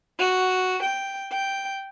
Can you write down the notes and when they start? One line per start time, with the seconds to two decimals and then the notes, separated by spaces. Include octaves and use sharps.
0.19 F#4
0.83 G5
1.31 G5